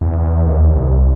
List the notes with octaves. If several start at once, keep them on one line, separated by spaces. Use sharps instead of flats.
E2
D#2
C2